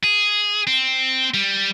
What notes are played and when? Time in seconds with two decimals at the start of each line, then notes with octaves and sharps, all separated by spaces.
0.04 G#4
0.67 C4
1.34 G3